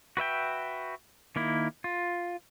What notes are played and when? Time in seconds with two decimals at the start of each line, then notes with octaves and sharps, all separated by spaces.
0.17 F#4 B4 E5 G5
1.36 D#3 A#3 E4
1.84 F4